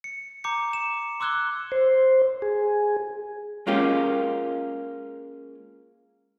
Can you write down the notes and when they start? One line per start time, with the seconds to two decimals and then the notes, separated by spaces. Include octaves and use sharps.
0.04 C#7
0.44 A#5 D6 G6 C#7
0.73 E7
1.20 C6 D6 E6 F#6 G#6 G7
1.72 C5
2.42 G#4
3.67 G#3 A#3 C#4 F4 G4